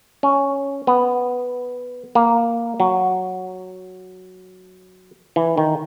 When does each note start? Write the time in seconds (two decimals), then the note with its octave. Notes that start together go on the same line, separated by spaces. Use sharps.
0.23 C#4
0.87 B3
2.15 A#3
2.80 F#3
5.36 E3
5.58 D#3